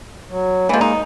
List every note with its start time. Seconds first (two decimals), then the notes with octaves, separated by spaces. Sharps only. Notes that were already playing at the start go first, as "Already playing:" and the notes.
0.29 F#3
0.69 E3 F3 G#3 A#3
0.81 D#4